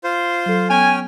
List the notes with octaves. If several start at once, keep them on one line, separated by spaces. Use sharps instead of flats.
F4 C5
F#3 A4
B3 C#4 G5 G#5 F6